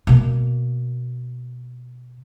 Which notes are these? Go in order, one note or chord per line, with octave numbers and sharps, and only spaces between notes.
B2 A#3